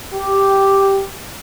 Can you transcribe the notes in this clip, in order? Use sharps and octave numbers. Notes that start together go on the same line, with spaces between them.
G4